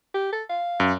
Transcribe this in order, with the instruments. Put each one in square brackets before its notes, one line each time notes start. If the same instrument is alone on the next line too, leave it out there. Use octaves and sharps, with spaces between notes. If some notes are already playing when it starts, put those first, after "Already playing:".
[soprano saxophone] G4
A4
F5
[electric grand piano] F#2